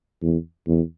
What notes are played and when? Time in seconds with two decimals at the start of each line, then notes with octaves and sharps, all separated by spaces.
0.22 E2
0.67 E2